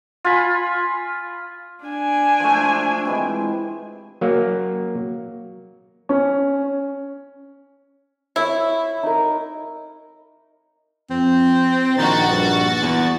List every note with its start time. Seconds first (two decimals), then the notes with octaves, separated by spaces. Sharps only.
0.25 F4 G#5 B5
1.85 D4 G#5
2.40 F3 A3
3.05 C3 E3 G#3
4.21 F#3 A#3
6.09 C#4
8.36 E4 C#5 E5 C6
9.03 D#4 A#4
11.10 F2 C4
11.97 A#1 D#3 F#4 A6
12.29 G2
12.81 E2